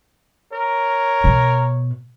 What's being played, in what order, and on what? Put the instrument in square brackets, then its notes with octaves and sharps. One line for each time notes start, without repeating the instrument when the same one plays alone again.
[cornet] A#4 [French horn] C#5
[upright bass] B2